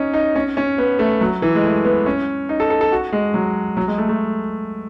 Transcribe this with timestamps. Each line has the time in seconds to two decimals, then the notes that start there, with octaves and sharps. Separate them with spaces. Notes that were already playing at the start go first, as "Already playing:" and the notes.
Already playing: C#4 D#4
0.13 D#4
0.35 C#4
0.57 C#4
0.78 B3
0.99 A3
1.21 F#3
1.42 E3
1.55 G#3
1.64 A3
1.85 B3
2.06 C#4
2.49 D#4
2.60 A4
2.70 A4
2.81 A4
2.92 F#4
3.12 G#3
3.34 F#3
3.77 F#3
3.88 G#3
3.98 A3
4.09 A3